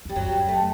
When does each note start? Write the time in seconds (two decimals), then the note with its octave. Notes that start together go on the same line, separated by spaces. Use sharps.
0.05 E2 G3
0.16 F#2 F#3
0.32 G3
0.49 A3